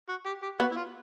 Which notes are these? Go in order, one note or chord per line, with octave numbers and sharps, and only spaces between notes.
F#4
G4
G4
B3 F#4
E4
F4